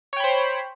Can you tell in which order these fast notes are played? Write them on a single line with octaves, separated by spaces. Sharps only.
C#5 G5 B5 C5